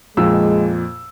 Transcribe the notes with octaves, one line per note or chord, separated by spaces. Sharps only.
F2 A#2 G#3 E6